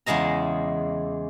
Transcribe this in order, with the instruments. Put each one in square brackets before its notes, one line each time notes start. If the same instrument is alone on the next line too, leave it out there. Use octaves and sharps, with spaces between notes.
[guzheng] E2 C#3 G#3 D#5 A#5